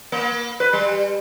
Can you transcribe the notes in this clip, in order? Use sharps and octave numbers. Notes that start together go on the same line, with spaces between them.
A#3
B4
G3